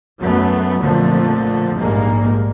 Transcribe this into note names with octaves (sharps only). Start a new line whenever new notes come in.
F#2 F#3 A3 B3
F2 A#2 D3 F3 A3
A#1 G#2 G3 G#3 A#3